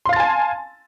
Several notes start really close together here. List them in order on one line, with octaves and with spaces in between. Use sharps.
C6 F5 A6 A5 G#5